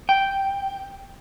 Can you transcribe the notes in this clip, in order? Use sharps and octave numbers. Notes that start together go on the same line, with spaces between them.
G5